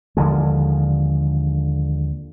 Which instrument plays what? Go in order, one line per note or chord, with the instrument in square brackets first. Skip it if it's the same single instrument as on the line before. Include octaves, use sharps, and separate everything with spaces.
[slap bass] D#2 D3 F3 G#3